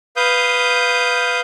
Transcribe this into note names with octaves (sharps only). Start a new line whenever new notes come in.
B4 F5 D#6 G6